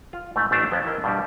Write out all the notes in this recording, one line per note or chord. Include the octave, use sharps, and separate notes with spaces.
F4
G#2 A3
A1 A3 D4 A5
F2 B3 C#4 G5
E4 A#4 D#5
G2 B2 G3